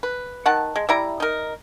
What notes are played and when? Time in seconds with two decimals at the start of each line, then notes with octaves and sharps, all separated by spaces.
0.03 B4
0.46 D#3 F#5 A5
0.76 G#3
0.89 G3 E4 A#5
1.20 D#4 A#4